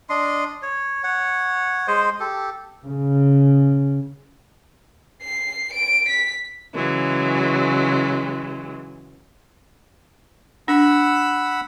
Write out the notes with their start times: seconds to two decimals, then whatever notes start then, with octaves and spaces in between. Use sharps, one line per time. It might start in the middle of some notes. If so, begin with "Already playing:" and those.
0.09 D4 D#5 C6
0.62 C#5
1.04 C#5 F#5
1.88 G#3 C5 D#5
2.20 G4 A4
2.84 C#3
5.22 C7
5.73 D7
6.08 B6
6.74 C#3 E3 F#3 G#3
10.68 D4 F#5 B5 E6